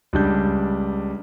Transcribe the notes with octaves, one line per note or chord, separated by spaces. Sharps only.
C#2 G3 D4 G6